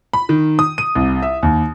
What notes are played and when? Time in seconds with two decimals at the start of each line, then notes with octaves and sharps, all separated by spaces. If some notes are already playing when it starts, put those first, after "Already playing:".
0.13 B5
0.29 D#3
0.59 D#6
0.78 D#7
0.95 C2
1.22 E5
1.43 D#2